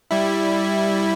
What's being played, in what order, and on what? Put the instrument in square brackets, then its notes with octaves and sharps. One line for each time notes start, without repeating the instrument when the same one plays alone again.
[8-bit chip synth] G3 E4